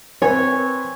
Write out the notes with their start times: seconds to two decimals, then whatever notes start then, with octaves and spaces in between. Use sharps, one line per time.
0.22 C4 B4 C#5 G#5